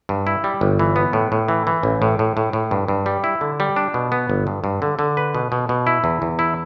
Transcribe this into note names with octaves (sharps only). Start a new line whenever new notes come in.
G2
E4
G3
G1
E3
B3
A2
A2
E3
E3
A1
A2
A2
A2
A2
G2
G2
G3
E4
D3
G3
D4
B2
B3
G1
G2
G2
D3
D3
B4
B2
B2
B2
E4
E2
E2
E4